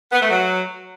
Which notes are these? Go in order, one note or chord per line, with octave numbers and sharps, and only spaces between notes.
B3
A3
F#3